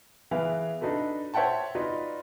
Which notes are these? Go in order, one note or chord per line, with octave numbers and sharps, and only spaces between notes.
E3 B3 E4 G#4 F5
D4 D#4 F#4 A4 B4
C5 C#5 E5 F#5 G5 A5
D#4 F4 F#4 B4 D5